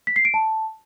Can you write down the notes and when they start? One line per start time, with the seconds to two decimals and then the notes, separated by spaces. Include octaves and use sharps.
0.07 B6
0.16 C7
0.25 D7
0.34 A5